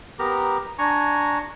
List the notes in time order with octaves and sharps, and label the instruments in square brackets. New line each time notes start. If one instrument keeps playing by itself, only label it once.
[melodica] B3 G4 A#4 A#5
D4 G#5 A#5 C#6